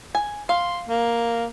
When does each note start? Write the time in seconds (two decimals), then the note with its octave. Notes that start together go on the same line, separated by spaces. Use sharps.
0.15 G#5
0.49 F5 C6
0.89 A#3